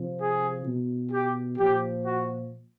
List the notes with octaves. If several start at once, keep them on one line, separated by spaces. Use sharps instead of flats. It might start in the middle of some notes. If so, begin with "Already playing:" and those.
Already playing: C3 F3
G#4
B2
G4
A#2 F3 G4
F#4